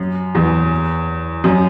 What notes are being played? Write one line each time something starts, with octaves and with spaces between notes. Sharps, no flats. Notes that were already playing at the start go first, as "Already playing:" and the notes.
Already playing: F#2
E2
F#2